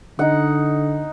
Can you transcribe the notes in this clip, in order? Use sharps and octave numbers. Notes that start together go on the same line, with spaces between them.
D3 D#4 F#5